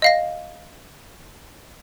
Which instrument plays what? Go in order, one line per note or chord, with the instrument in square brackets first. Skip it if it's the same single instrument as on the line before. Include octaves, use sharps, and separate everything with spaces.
[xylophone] D#5 F5 A#6